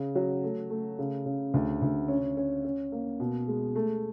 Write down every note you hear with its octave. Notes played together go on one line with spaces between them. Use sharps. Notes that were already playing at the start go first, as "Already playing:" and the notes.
Already playing: C#3
F#3
A3
A3
C#3
C#3
D2
D2
C#4
C#4
C#4
A#3
B2
G#3
A3